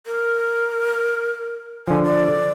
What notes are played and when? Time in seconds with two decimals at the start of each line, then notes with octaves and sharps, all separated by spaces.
0.06 A#4
1.88 D3 F3 G#5
2.05 D5